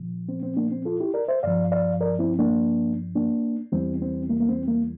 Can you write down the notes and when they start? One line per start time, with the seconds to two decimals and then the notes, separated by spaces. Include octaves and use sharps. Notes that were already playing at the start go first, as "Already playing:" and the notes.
Already playing: A#2 F3
0.29 C4
0.43 C4
0.57 A#3 D4
0.71 C4
0.85 F4 A4
1.00 E4 G4
1.14 A#4 D5
1.28 C5 E5
1.43 G2 F3 D5 F5
1.72 D5 F5
2.00 A#4 D5
2.19 C4 E4
2.39 A#3 D4
3.15 A#3 D4
3.72 E2 E3 G3 C4
4.02 C4
4.30 A#3
4.40 A#3
4.49 C4
4.68 A#3